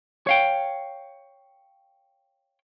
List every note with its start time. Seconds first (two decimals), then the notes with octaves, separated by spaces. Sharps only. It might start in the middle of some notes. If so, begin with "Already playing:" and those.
0.27 C#5 F5 G5